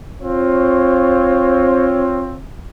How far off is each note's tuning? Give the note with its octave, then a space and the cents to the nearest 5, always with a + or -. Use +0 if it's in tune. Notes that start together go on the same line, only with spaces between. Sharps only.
C4 +20 F4 +10 C#5 +0